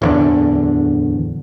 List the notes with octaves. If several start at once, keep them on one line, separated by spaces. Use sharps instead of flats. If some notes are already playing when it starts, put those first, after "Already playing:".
D1 E2 D3